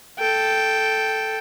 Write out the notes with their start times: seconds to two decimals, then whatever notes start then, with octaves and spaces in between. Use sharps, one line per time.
0.19 A4 G5